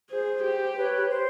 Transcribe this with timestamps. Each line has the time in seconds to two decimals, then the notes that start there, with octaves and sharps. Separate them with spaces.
0.10 G#4 C5
0.44 G4
0.76 B4 C#5
1.09 C5